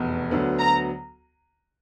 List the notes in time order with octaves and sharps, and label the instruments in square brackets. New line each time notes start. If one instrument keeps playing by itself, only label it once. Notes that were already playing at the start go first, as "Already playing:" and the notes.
Already playing: [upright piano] F1 E2 B2
D2 D3 F#3 B3
[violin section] A#5